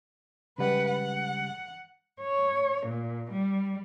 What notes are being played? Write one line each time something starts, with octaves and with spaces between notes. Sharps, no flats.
C#3 G3 G#3 B4 F#5
F#5
C#5
A#2
G3